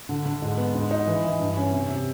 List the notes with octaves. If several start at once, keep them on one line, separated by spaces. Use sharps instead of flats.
D3
D3
G#2
B3
G#2
D#4
E3
E3
G2
C#4
C3
C3